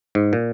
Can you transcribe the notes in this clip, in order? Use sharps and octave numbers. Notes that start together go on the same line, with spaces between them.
G#2
A#2